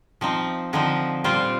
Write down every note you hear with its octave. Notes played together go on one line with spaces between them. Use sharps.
F3 C4 D#4
D3 F3 C4 D#4
A#2 G3 C4 F4 C5